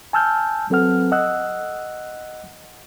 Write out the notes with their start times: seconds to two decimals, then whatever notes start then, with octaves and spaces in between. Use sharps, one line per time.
0.13 G#5 A5 E6 F6 G6
0.70 F#3 C4 A4 B4 F#5 F6
1.12 D#5 F#5 E6 F#6